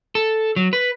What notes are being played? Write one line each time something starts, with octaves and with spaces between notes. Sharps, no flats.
A4
F#3
B4